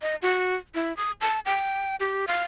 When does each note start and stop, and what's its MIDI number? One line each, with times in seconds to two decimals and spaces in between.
0.02 0.16 75
0.22 0.56 66
0.75 0.95 64
0.97 1.12 87
1.21 1.40 81
1.46 1.96 79
2.00 2.26 67
2.28 2.44 77